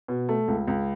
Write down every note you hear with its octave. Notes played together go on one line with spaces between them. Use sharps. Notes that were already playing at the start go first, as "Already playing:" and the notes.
B2
A3
C#2
C#2